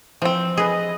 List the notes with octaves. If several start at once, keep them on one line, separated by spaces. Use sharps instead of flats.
E3 F3 C4
G#4 B4 D#5